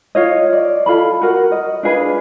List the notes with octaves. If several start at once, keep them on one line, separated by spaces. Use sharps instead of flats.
F4 C#5 D#5
D5
F4 A4 B5
F#4 A#4 F#5
D#5
D4 F4 G#4 B4